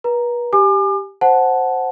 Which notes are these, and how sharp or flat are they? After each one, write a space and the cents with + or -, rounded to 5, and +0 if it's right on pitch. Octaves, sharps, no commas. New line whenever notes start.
B4 -40 A#5 +0
G4 +0 G#5 +0 D6 +40
C5 +0 F#5 +0 A5 -10